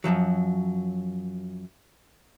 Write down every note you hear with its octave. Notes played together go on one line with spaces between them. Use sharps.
F#2 A#2 F3 F#3